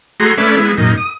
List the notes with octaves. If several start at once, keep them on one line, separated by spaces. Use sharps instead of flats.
A3 F#4 G#4 A#5 C6
A3 C#4 B4 D5 E5
G#3 B3 E4
F#2 A#2 D#4
D#6